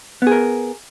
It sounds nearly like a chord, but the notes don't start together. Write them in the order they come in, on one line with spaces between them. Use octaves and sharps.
B3 G#4 A#4